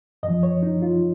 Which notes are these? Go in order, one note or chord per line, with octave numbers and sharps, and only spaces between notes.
F#2 D#5
F3
C#5
D#4
F4